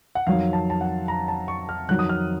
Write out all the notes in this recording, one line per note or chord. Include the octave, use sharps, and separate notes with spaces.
F#5
F2 D#3 F#3 F5
A5
A5
F#5
A#5
A5
C#6
F6
F2 D#3 F#3 F#6
D#6
F6